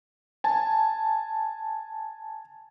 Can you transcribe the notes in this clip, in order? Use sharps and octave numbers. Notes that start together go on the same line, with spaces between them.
G#5 A5